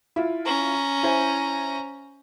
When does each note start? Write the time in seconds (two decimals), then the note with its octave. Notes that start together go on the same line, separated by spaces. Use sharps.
0.16 E4 F4
0.45 C#4 A#5
1.03 E4 C5 G#5